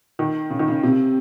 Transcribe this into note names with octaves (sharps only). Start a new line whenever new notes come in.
D#3
C#3
D#3
C#3
C3